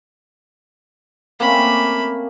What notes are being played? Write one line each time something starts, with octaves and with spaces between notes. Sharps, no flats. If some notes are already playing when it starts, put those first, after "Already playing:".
A3 A#3 C4 C#4 B5